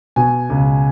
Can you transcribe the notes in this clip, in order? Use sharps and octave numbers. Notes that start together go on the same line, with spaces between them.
B2 G#5
C#2